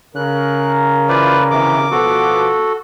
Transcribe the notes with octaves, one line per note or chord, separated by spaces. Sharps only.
C#3 A#4 F#6
E3 F4 B4 C5 D5
C3 D#3 E3 D6
B2 F3 B3 F#4 A4